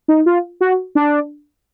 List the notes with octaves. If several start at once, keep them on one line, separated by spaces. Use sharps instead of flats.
D#4
F4
F#4
D4